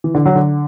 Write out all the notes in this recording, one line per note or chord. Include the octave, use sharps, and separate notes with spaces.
E3
D3
F#3
D3